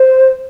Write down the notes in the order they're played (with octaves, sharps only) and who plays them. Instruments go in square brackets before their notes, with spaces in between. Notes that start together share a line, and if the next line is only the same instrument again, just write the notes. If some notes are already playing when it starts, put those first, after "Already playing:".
Already playing: [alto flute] C5